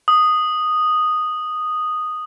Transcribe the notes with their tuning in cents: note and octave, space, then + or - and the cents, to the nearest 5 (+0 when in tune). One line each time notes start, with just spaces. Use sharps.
D#6 -5